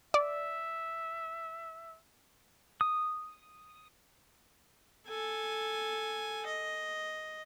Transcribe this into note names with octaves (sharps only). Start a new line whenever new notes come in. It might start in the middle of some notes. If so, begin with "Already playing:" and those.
D5 E5
D#6
A4 G#5
D#5